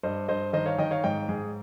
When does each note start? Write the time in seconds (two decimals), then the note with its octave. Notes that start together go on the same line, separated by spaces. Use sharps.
0.03 G2 C5 D#5
0.28 G2 C5 D#5
0.53 D#3 C5 D#5
0.66 C#5 F5
0.78 D#3 D#5 G5
0.91 C#5 F5
1.04 G#2 D#5 G5
1.29 G#2 G#4